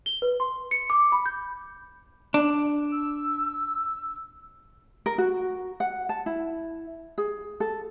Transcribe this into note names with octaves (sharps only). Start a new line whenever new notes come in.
G7
B4
C6
C#7
D6
B5
G6
D4
E6
A#4
F#4
F#5
A5
E4
G#4
A4